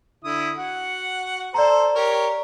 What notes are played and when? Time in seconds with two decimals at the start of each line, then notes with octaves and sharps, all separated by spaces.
0.24 D3 E4 D#6
0.58 F#4 F#5
1.54 A4 C5 D5 A#5
1.95 G4 A#4 C#5